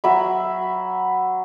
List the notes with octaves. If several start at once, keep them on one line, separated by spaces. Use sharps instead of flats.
F#3 E5 B5